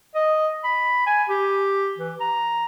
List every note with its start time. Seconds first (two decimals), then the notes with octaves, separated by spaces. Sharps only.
0.15 D#5
0.64 B5
1.06 G#5
1.29 G4
1.98 E3
2.20 A#5